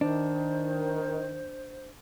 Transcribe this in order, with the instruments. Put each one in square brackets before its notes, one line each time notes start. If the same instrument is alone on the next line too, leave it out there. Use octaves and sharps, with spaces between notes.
[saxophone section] D#3 [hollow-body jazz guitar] D4 [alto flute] C5